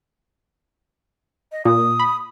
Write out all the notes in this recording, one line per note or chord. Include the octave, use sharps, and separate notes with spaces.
D#5
A#2 D#6
B5